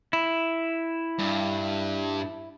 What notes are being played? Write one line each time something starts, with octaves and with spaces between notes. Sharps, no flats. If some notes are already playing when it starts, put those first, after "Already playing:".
E4
G2